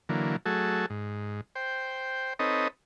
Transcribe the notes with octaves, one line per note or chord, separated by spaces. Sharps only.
D3 E3 F#3 A#3
F#3 A3 F#4 G#4 A4
G#2
C5 G5
C4 D#4 A4 B4 C#5 D#5